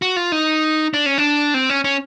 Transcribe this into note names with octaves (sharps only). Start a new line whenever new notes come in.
F#4
F4
D#4
D4
C#4
D4
C4
C#4
C#4